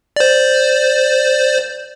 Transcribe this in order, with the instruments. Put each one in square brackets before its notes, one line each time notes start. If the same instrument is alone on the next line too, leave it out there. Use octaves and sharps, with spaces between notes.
[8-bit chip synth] C5 D5